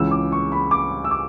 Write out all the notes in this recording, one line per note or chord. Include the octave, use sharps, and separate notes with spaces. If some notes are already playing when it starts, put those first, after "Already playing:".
Already playing: C#2 C#3 E3 E6
D6
C#6
B5
D6
E6
D6